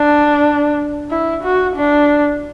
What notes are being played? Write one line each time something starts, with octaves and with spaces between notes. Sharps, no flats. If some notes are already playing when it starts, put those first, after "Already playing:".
Already playing: D4
E4
F#4
D4